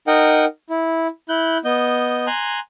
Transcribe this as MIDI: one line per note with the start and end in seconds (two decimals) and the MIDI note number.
0.07 0.45 63
0.07 0.45 70
0.07 0.45 75
0.07 0.45 78
0.07 0.45 79
0.70 1.08 64
1.29 1.58 64
1.29 1.58 90
1.29 1.58 91
1.65 2.26 59
1.65 2.26 75
1.65 2.26 91
2.27 2.60 80
2.27 2.60 82
2.27 2.60 84
2.27 2.60 90